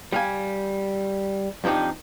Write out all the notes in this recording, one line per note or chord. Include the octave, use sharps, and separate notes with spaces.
G3 F5 G#5
F2 F3 D4 D#4 G4